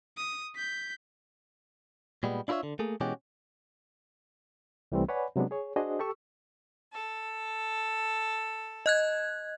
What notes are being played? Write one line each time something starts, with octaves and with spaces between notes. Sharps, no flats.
D#6
G6 B6
A#2 G3 G#3 B3
D4 E4 F4 A#4 C#5 E5
D3
A3 A#3 G#4
B2 E3 G#3 C#4 F#4 G4
C2 E3 G3 A3 C4
B4 C#5 D5 F#5 G#5 B5
C3 F#3 G#3 B3 D4
G#4 C#5
D4 F#4 G#4 C5 D#5
G4 A4 C#6 E6
A4
D#5 F#6 G#6